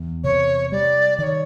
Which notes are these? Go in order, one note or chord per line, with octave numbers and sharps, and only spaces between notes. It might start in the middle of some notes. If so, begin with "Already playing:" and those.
Already playing: E2
C3 C#5
G3 D5
D#3 C#5 D5